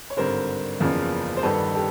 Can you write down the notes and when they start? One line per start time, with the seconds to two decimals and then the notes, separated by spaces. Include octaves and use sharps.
0.10 C#5
0.16 G#1 G2 D3 A#4 C5
0.80 F#1 E2 C#3 F3 A#3
1.37 C5
1.43 G1 G2 D#3 A4 B4
1.74 G4 A4